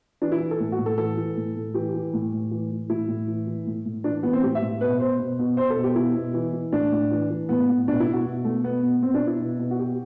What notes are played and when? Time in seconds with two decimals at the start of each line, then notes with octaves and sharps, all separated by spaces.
0.22 E3 D4
0.32 E4
0.40 E3
0.51 A4
0.60 A2
0.72 F#4
0.78 A2
0.86 A4
0.98 E3 A4
1.17 E3
1.37 A2
1.56 A2
1.74 E3 G4
1.94 E3
2.14 A2
2.33 A2
2.51 E3
2.71 E3
2.90 A2 E4
3.08 A2
3.27 E3
3.47 E3
3.67 A2
3.85 A2
4.04 E3 D4
4.23 E3 B3
4.33 C4
4.43 A2 G4
4.55 E5
4.62 A2
4.81 B2 B4
5.00 B2 C5
5.19 B2
5.39 B2
5.57 B2 C5
5.70 A4
5.76 B2
5.84 G4
5.96 B2 E4
6.16 B2
6.34 E3
6.53 E3
6.72 A2 D4
6.92 A2
7.11 E3
7.30 E3
7.49 A2 B3
7.69 A2
7.87 B2 D4
8.00 E4
8.07 B2
8.13 F#4
8.26 B2
8.45 B2 A3
8.64 B2 B3
8.83 B2
9.02 B2 C4
9.14 D4
9.21 B2
9.27 E4
9.41 B2
9.59 B2
9.71 F#4
9.79 B2 G4